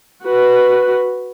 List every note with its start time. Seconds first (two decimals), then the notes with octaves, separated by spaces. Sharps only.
0.24 F#4 B4